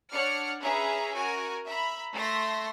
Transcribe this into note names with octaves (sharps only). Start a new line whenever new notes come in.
D4 C#5 D5 F#5 F6 C#7
C#4 G#4 B4 E5 A#5
F#4 A#4 G#5
E5 A#5 B5
A3 E5 C6 A#6